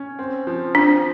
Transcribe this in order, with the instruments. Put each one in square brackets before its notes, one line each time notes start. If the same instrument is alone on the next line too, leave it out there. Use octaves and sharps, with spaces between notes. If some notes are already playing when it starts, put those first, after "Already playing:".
Already playing: [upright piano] C#4
C4
F3
[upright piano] C4 [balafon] D4